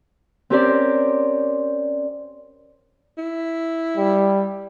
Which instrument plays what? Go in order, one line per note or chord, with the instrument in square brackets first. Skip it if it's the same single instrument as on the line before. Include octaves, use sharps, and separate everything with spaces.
[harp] C4 C#4 G4 A#4 C5 D5
[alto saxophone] E4
[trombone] G3